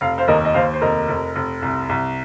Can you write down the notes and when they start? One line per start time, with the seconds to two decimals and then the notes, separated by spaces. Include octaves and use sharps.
0.01 F1 F5
0.18 C5 F5
0.28 D#2 A#4 D#5
0.45 D#5
0.54 D#2 C5 F5
0.73 C5
0.81 F1 A#4 D#5
1.08 F1
1.36 F1
1.62 C2
1.89 C2